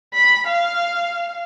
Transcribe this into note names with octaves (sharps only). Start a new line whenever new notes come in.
B5
F5